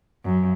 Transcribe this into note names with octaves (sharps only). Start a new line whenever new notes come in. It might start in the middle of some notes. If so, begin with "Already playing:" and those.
F#2